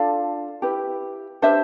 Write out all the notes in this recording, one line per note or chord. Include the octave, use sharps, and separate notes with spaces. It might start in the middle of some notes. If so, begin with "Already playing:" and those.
Already playing: D4 F4 A4 D5 F5
E4 G4 B4
D4 G4 B4 C5 E5